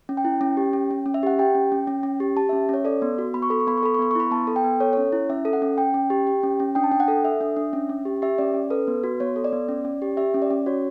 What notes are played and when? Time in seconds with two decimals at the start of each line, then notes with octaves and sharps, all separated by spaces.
0.09 C#4
0.17 G5
0.25 E4
0.41 C#4
0.57 G4
0.73 C#4
0.91 C#4
1.06 C#4
1.14 E5
1.23 G4 F#5
1.39 G4 G5
1.55 C#4
1.72 C#4
1.87 C#4
2.03 C#4
2.20 G4
2.37 G4 A5
2.49 C#4 E5
2.69 C#4 C#5
2.85 A4 D5
3.02 B3
3.18 F#4
3.34 B3 B5
3.42 C#6
3.50 A4 B5
3.60 C#6
3.67 B3 B5
3.77 C#6
3.83 A4 B5
3.94 C#6
3.99 B3 B5
4.11 C#6
4.16 E4 B5
4.31 B3 A5
4.47 A4
4.56 G5
4.64 B3
4.80 A4 C#5
4.93 C#4 C#5
5.12 E4
5.30 C#4 E5
5.45 A4
5.53 F#5
5.62 C#4
5.78 C#4 G5
5.94 C#4
6.10 G4
6.27 G4
6.43 C#4
6.60 C#4
6.75 D4 G5
6.84 A5
6.92 D4 G5
7.00 F#5
7.08 A4
7.25 A4 E5
7.41 D4
7.56 D4
7.73 C#4
7.89 C#4
8.05 G4
8.22 G4 E5
8.38 C#4 D5
8.54 C#4
8.70 A4 B4
8.87 B3
9.04 F#4
9.20 B3 C#5
9.36 A4
9.44 D5
9.53 B3
9.69 C#4
9.85 C#4
10.02 G4
10.17 G4 E5
10.34 C#4
10.42 D5
10.50 C#4
10.66 F#4 C#5